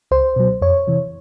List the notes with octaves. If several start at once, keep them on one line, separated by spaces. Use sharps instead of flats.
C#2 C5
B2 F#3
F2 C#5
C3 E3